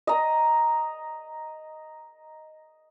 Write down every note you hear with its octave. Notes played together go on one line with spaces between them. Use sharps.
D#5 A#5